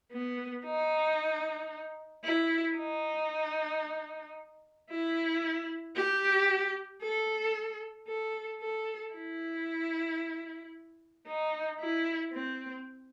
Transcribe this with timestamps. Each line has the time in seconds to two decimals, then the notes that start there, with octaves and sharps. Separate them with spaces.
0.12 B3
0.65 D#4
2.24 E4
2.77 D#4
4.90 E4
5.96 G4
7.02 A4
8.08 A4
8.60 A4
9.15 E4
11.26 D#4
11.80 E4
12.33 C4